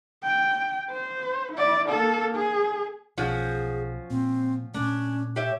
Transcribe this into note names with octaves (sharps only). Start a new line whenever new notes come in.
G5
C5
E4 D5
A#3 A4
G#4
B1 F3 C#4 F#4 G#4
A#2 C4
A#2 A3 C#4 D4
G4 C#5 E5